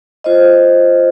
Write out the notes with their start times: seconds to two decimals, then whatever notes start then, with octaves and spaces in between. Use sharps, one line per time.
0.24 F4 C5 D#5